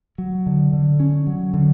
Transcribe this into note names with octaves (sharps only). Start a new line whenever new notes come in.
F#3
D3
D3
C#4
F#3
D3